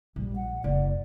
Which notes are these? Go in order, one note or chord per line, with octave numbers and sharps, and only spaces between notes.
A#1 G3
F#5
F#1 D5